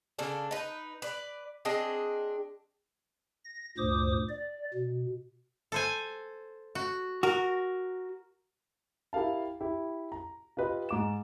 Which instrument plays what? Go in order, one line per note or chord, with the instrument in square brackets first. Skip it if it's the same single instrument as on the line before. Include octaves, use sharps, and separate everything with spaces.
[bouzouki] C#3 A#3 D4 A4
D#4 B4
B4 D5
C4 D4 G#4 D#5
[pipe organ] A#6
D2 G2 A#2 C5 D6 D#6
D5
B2
[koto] A4 C5 G#5
F#4
[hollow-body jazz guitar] F#4 [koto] A#4
[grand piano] E4 G4 A#4 F5 A5
E4 G4
A#5
F4 G4 B4 D#5
G#2 D6 E7